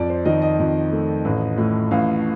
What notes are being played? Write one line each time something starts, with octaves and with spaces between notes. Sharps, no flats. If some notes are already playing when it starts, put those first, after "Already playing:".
Already playing: F2 D5
C5
D#3 D#5
D#5
F2
A3
A1
A2
A1 F5